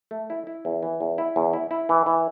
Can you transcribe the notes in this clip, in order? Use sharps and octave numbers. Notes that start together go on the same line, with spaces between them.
A3
E4
E4
E2
E3
E2
E4
E2
E4
E4
E3
E3